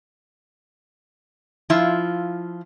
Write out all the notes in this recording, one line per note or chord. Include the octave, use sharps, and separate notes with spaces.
F3 E4 F4